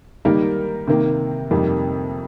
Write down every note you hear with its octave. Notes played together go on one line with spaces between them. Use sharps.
D#3 G3 A#3 D#4 A#4
C3 D#3 A#3
F2 C3 G3 A#3 D#4